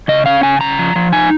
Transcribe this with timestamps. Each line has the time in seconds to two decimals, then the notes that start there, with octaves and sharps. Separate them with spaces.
0.08 C#3 D#5
0.26 C#4 F5
0.43 C#3 G#5
0.61 C#3 A#5
0.79 F3
0.96 F3
1.12 D#4 G#5